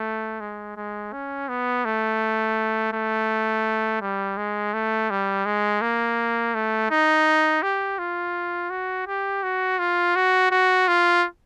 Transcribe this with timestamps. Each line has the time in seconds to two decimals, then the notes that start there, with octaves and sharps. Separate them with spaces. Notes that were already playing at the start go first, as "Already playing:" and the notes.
Already playing: A3
0.40 G#3
0.76 G#3
1.13 C#4
1.49 B3
1.85 A3
2.93 A3
4.01 G3
4.37 G#3
4.74 A3
5.10 G3
5.45 G#3
5.82 A#3
6.54 A3
6.90 D#4
7.63 G4
7.99 F4
8.70 F#4
9.07 G4
9.43 F#4
9.79 F4
10.16 F#4
10.51 F#4
10.88 F4